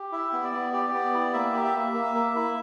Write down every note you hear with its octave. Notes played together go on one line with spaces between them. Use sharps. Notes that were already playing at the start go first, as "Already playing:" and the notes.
Already playing: G4
E4 E5
B3
D5
B3
G4 D5
B3
E4
A#3 E5
G4
E5
A#3
A#3
A#3
E4